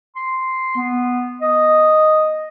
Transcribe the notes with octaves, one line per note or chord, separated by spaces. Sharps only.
C6
B3
D#5